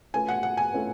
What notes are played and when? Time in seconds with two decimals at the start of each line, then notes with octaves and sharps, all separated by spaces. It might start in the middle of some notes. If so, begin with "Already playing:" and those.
0.14 A3 C#4 F4 B4 G#5
0.28 F#5
0.43 F#5
0.57 G#5
0.72 A3 C#4 F4 B4